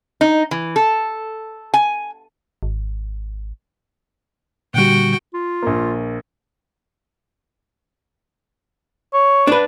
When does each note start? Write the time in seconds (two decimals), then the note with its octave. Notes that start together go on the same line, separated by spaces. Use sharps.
0.21 D#4
0.51 E3
0.76 A4
1.74 G#5
2.63 G#1
4.74 A#2 D3 G3 F#4 G5
5.34 F4
5.62 A#1 A#3
9.13 C#5
9.47 D4 B4